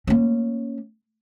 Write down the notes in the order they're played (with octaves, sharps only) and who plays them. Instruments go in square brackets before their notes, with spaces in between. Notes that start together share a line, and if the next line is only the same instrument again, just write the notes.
[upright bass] A#3 C#4